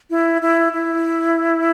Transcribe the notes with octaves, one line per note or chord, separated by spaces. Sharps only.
E4
E4
E4